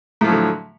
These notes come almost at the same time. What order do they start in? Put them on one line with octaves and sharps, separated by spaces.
A2 F3 F#3 D3